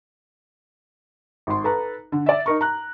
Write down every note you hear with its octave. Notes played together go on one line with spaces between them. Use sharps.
G#1 C6
A4 B4 A#5
D3
D5 E5
D#4 A#4 C#6
A#5 F#6